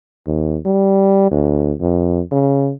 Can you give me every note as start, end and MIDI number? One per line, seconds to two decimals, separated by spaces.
0.27 0.58 39
0.65 1.31 55
1.31 1.73 38
1.81 2.21 41
2.31 2.72 49